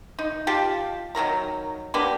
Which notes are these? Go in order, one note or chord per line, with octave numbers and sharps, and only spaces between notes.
D#4
F4 G4 A5
D#3 F#3 A#4 A#5
A#3 B3 D4 G4